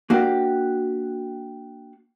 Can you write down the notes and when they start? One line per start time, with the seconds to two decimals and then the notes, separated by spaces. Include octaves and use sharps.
0.10 A#3 D4 F#4 G4 F5